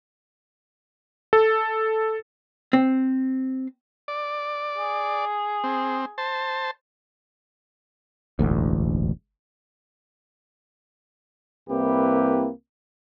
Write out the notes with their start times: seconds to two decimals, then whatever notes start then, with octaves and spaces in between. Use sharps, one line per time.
1.33 A4
2.73 C4
4.08 D5
4.78 G#4
5.64 C4
6.18 C5 A5
8.39 E1 A1 D2
11.69 C2 A#3 C4 E4 G4 B4